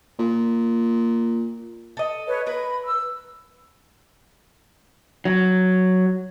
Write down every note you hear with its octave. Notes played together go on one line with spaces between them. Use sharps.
A#2
A4 D#5
B4 C#5
A#4 B4 B5
E6
F#3